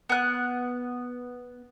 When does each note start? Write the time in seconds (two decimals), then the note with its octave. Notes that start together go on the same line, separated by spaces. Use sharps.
0.09 B3 F#6